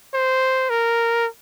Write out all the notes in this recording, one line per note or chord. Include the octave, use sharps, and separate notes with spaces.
C5
A#4